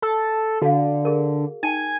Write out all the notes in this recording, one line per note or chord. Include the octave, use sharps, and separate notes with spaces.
A4
D3 F#4 F5
G#4 A#4
D#4 G5 G#5